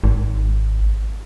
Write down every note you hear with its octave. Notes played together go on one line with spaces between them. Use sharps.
G#1